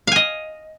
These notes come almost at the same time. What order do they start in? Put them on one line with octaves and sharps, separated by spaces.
F5 G#5 D#5